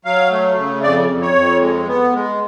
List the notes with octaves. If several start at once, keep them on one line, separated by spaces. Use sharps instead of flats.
F#3 F5
A3
C#3
F2 D5
F2
C#5
F2
G#3
B3
G#3